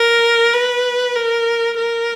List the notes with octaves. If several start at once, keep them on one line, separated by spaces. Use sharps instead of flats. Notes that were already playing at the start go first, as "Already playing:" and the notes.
Already playing: A#4
B4
A#4
A#4